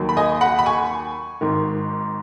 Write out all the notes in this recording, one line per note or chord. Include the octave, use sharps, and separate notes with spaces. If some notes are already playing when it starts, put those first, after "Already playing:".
Already playing: D#2 D#3 F#3
B5
D#5 G#5
F#5 B5
B5
G#5 C#6
G#1 G#2 D#3